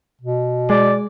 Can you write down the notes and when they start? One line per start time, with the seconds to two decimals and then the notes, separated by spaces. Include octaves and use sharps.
0.21 B2
0.70 G#3 D5